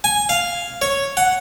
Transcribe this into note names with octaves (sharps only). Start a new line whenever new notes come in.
G#5
F5
C#5
F#5